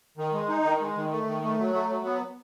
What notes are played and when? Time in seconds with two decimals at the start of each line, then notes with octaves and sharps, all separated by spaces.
0.17 D#3
0.33 G#3
0.49 D#4
0.65 D#3
0.80 G#3
0.95 D#3
1.11 A3
1.26 D#3
1.42 A3
1.58 F#3
1.73 A3
1.89 F#3
2.05 B3